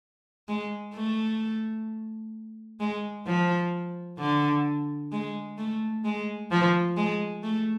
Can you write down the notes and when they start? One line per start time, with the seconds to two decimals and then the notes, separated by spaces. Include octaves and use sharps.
0.48 G#3
0.95 A3
2.80 G#3
3.27 F3
4.19 D3
5.12 G#3
5.58 A3
6.05 G#3
6.51 F3
6.97 G#3
7.43 A3